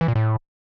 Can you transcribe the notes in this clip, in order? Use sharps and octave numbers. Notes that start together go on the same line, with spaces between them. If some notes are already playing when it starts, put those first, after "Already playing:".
E3
A#2
A2